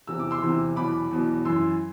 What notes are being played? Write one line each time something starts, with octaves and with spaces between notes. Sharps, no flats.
E2 C3 E3 E6
D6
C6 E6
E2 C3 E3
E2 B2 F#3 B5 D6
E2 B2 F#3
F#2 E3 C6 E6